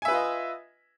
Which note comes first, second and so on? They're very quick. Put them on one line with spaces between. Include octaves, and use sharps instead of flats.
G#5 E5 B4 F4 D#5